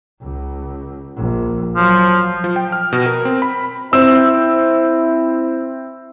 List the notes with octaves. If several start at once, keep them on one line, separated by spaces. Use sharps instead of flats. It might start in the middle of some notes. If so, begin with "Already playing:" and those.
C#2
A#1
F3 F#3
F3
G5
F6
B2
A#4
C4
B5
C4 E4 E6